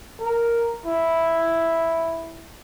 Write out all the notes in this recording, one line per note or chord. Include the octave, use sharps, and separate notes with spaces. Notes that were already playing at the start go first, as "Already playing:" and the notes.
A#4
E4